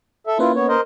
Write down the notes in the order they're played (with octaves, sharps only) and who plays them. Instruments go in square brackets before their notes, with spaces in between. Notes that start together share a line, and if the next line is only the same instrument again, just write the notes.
[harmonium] A4 E5
[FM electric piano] A#3 C#4 B4 [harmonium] E4 F4
[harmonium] B3 C#5
A#4 C5 D#5